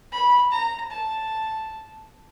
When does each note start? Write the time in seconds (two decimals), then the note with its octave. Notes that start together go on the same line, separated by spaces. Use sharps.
0.12 B5
0.52 A#5
0.91 A5